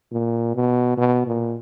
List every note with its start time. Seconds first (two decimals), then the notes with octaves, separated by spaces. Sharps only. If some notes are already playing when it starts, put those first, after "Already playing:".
0.12 A#2
0.55 B2
0.98 B2
1.27 A#2